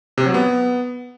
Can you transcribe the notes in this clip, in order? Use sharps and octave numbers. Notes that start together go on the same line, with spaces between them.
C3
F#3
B3